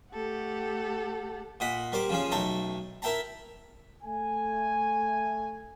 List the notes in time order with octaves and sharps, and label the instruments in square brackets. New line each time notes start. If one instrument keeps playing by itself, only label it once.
[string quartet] A3 G4 A4 F#5
[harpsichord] A#2 D#5 F#5 B5
G3 A#4 C5 D6
C#3 F3 C#4
B1 A3 A4 G5 A#5
E4 A#4 E5 G5 A5 A#5
[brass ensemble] A3 G#5